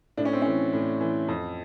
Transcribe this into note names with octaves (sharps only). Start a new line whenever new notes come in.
A2 D4
C#4
C4
E3 C#4
A2
E3
F2